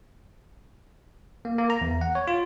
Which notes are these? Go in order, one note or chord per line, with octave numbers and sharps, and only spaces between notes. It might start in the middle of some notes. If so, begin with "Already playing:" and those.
A#3
A#3
A#5
E2
F#5
C#5
F4